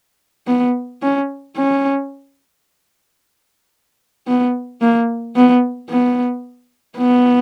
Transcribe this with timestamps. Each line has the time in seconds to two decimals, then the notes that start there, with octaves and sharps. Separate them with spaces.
0.47 B3
1.02 C#4
1.56 C#4
4.28 B3
4.82 A#3
5.36 B3
5.90 B3
6.98 B3